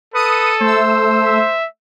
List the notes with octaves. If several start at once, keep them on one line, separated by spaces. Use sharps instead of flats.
A4 B4 D#6 C#7 D#7
A3 C5 E6
E5